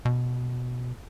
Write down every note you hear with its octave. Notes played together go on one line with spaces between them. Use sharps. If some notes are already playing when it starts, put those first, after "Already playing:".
B2